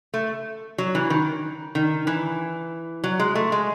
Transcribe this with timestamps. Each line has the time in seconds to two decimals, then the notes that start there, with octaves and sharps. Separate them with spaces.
0.14 A3
0.78 F#3
0.95 E3
1.10 D#3
1.75 D#3
2.07 E3
3.04 F#3
3.19 G#3
3.35 A3
3.52 G#3